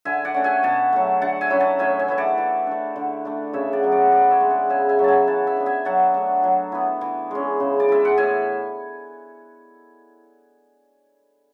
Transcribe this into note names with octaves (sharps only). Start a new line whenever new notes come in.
D3 E5 G#5
D5 F#5
A3 C#4
E5 G#5
B2 F#5 A5
F#3 A3
D3 F#5 A5
E5 G#5
F#3 C#4 E4
F#5 A5
A2 E5 G#5
E5 G#5
E3 A3 E4
D5 F#5
E3
A3 D4
D3
A3 D4
C#3 C#5 E5
D5 F#5
F#3 B3
D5 F#5
B2 B4 D5
C#5 E5
G#3 D4
D5 F#5
C#3 E5 G#5
E5 G#5
F#3 C#4
E5 G#5 A5
E3 F#5 A5
E5 G#5
B3 D4
E5 G#5
F#3 F#5 A5
A3 D4
F#3
B3 E4
E3
G#3 C#4
C#3
D5
E3 G#3 E5
F#5
A2 E5 G#5